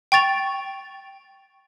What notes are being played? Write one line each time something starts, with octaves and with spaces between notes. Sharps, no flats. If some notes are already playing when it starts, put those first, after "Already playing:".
G5 C#6 A6 F7